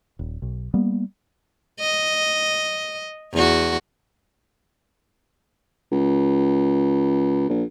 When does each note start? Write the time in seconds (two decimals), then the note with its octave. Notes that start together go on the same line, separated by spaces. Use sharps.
0.19 D#1
0.42 B1
0.74 G3 A#3 B3
1.80 D#5
3.33 E2 F#4
5.91 C#2
7.49 A#1